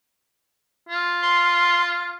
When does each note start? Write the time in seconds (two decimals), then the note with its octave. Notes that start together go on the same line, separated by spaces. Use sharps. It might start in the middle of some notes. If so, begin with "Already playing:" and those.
0.89 F4
1.22 C6